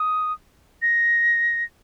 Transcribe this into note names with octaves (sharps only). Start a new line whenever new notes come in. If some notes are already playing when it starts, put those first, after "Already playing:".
Already playing: D#6
A#6